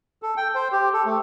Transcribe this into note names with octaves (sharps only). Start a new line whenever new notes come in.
A4
G5
C5
G4
A4
A3